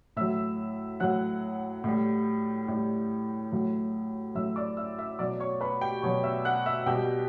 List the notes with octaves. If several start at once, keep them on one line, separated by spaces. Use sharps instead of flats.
A2 F#3 E5 E6
A2 F#3 F#5 F#6
A2 G3
A2 G3
A2 F#3
A2 F#3 E5 E6
D5 D6
E5 E6
E5 E6
B2 F#3 D5 D6
C#5 C#6
B4 B5
G4 G5
B2 F#3 C#5 C#6
E5 E6
F#5 F#6
E5 E6
B2 G3 G4 G5